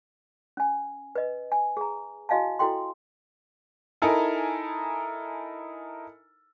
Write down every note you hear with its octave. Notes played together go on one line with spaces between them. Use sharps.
C#4 G#5
B4 D#5
G#5
G#4 A#5
E4 F#4 D#5 F5 G#5 A5
E4 F#4 A4 G5 C6
D#4 E4 A4 A#4 G#5 A#5